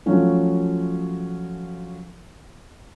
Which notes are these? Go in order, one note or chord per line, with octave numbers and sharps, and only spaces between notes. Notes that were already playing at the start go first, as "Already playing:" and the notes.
F3 F#3 A3 C#4 F#4